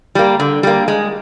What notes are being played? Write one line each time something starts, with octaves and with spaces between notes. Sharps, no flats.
G3 A#3
D3
G3 A#3
G#3